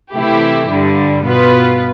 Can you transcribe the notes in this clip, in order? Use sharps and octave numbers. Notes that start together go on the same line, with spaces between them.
C3 E3 A3 E4 G4
G2 D3 G3
B2 B3 F4 B4